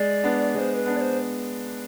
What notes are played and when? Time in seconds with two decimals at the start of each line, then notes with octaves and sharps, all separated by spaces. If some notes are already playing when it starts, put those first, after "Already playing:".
Already playing: G#3 D5
0.24 B3 D4
0.55 G#3 D5
0.59 C5
0.76 B4
0.86 B3 D4
0.96 D5
1.01 C5